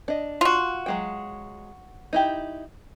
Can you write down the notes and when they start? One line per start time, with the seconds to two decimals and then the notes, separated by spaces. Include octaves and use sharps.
0.08 D4 D#5
0.41 F4 F#4
0.86 F#3 G#3 G5
2.13 D#4 E4 G4